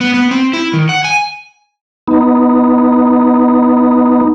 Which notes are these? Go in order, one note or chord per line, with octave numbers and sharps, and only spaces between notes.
B3
B3
C4
E4
D#3
F#5
G#5
B3 D#4